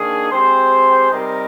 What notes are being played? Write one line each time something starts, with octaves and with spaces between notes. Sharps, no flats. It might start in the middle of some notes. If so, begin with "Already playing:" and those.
Already playing: D#3 A#3 D4 G#4
G#3 C4 G4 C5
C3 G3 C4 D#4 A#4